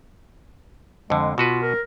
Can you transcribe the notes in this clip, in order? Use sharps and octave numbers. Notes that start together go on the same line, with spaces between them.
F2 D3 G#3
B2 F4 F#4 B4
A#4